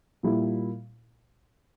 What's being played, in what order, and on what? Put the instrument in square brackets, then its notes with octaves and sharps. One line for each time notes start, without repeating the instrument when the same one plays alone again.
[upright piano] A#2 G3 A#3 E4